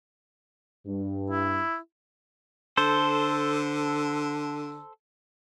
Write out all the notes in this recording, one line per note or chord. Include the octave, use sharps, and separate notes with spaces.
G2
E4
D3 A4 C5